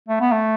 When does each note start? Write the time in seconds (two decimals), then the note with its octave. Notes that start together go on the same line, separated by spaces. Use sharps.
0.09 A3
0.21 B3
0.32 A3